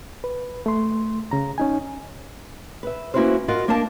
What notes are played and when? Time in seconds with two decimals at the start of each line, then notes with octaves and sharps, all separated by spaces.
0.24 B4
0.66 A3 C6
1.31 C#3 A#5
1.58 C#4 D#4 G#5
2.83 B4 E5
3.14 A#3 C#4 E4 F#4 B4 C5
3.48 F4 F#4 A#4 D#5 F5 F#5
3.68 A#3 D4 A#4 F5 A5